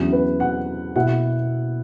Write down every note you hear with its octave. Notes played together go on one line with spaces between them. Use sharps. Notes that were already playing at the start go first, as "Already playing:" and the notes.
Already playing: E2 D3 F#3 C#4 E4
B4
F#5
B2 A#3 E4 F#5